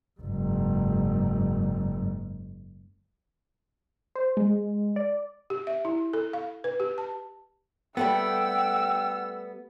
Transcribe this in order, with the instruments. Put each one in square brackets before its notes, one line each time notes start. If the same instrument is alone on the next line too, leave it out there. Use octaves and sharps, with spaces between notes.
[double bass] F#1 G#2
[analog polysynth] C5
G#3
D5
[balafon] G4
E5
E4
A4
F5
B4
G4
A5
[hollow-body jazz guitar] G3 A3 B3 [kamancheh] F#5 E6 [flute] G5